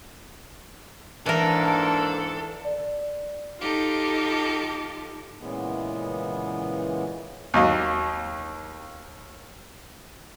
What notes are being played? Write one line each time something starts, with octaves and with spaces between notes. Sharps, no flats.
G#2 E3 A#3 D4 A4 A#4
D5
D#4 F4 G4 A4
A#2 C#3 E3 G#3 B3
D#2 F#3 D#5 F5